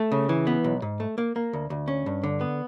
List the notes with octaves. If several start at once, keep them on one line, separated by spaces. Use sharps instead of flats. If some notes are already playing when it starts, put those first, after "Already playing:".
Already playing: A3
C#3
E3
B3
B1
G#2
A3
A#3
A#3
D2
D2
C#4
G2
D3
B3